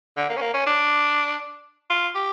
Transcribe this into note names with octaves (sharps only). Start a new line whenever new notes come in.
D3
A#3
C#4
A#3
C#4
D4
F4
G4